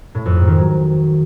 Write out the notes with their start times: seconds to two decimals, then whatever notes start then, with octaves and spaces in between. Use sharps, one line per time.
0.15 A2
0.26 F2
0.36 G#2
0.47 D#3
0.58 F#3